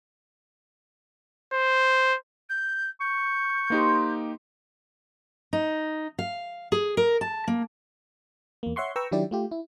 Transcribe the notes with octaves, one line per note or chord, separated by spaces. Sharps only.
C5
G6
C#6 G6
A#3 D#4 G4 C5 D#5 C6
D#4
F5
G#4
A#4
A5
A#3
E2 A#3
C#5 E5 F#5 C6 C#6
B4 G5 A#5 C#6 E6
D#3 F#3 D4 E4 G4 D5
A3 F4 G4
E4